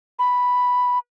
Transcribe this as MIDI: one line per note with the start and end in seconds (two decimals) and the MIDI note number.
0.19 0.99 83